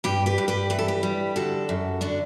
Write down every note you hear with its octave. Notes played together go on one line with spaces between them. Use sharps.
G2 G4 B4
G4 B4
G2
G4 B4
E3 B4
A4
G4 B4
G3
D3 F#4 A4
F#2
D3 D4 F#4